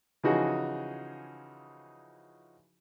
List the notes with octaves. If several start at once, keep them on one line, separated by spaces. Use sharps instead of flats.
C#3 E3 F3 D#4 F#4 G#4